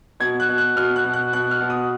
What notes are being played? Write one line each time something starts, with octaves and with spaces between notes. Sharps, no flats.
B2 G#6
F#6
B2
F#6
B2 F6
F#6
B2
F#6
B2 F#6
F6
B2
D#6